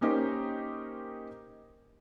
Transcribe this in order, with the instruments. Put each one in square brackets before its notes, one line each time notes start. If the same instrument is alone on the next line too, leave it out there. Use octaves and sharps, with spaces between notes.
[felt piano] A#3 C#4 D#4 G4 A#4 C5